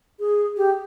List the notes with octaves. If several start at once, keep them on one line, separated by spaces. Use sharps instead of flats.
G#4
G4